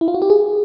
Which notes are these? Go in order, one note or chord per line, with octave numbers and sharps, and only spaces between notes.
E4
F4
F#4
G4
G#4